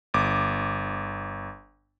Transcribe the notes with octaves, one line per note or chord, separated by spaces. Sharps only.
G1 D6